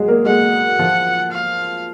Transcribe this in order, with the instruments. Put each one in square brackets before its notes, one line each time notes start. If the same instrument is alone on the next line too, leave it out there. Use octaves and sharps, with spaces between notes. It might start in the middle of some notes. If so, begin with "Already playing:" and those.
Already playing: [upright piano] F#3 G#3 F#4 G#4
A#3 A#4
[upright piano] G#3 G#4 [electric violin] F#5
[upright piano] F3 F4
[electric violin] F5